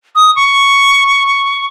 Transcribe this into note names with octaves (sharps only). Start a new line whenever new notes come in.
D#6
C#6